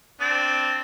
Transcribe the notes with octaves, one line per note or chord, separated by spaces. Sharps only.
C4 D4